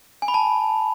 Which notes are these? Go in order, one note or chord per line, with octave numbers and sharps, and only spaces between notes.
G#5
B5
A5